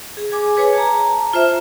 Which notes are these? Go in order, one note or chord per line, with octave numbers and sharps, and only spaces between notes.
G#4
G#4 G#5 D6
G#4 B4 C#5 G#5
A5 A#5
F4 C5 E5